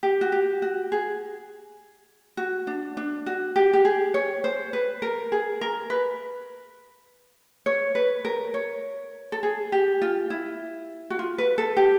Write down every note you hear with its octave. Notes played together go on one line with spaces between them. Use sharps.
G4
F#4
G4
F#4
G#4
F#4
D4
D4
F#4
G4
G4
G#4
C#5
C5
B4
A#4
G#4
A#4
B4
C#5
B4
A#4
C#5
A4
G#4
G4
F4
E4
F#4
F4
B4
A4
G4